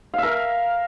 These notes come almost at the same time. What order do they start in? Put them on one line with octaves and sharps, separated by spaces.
F5 E5 A#4